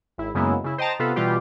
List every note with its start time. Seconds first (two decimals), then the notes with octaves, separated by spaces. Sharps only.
0.18 G#1 E4
0.35 F#2 C#3 G#3 A#3 B3 E4
0.64 C#3 E4
0.78 C5 D#5 G5 A5 A#5
0.99 C3 B3 F4 A4 B4
1.16 B2 E3 G3 F4 G4